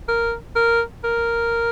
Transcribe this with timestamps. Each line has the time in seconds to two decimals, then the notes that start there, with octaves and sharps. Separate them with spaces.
0.08 A#4
0.56 A#4
1.04 A#4